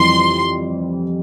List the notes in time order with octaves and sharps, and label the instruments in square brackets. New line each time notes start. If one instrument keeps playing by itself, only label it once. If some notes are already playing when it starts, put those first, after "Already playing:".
Already playing: [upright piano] F2 E3 G3 [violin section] C6